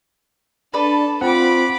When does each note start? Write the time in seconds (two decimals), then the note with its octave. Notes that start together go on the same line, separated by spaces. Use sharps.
0.74 D4 A4 B4 D5
1.21 C4 F4 F#5 B5 D6